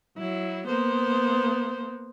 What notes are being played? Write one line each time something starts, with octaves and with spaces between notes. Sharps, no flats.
F#3 E4
A#3 B3 C5